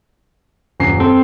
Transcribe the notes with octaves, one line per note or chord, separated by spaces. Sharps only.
D#1 F#2 C7
C4 A4